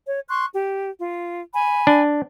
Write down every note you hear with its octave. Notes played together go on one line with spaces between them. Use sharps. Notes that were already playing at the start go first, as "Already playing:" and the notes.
C#5
C6 C#6 F#6
G4
F4
G#5 B5
D4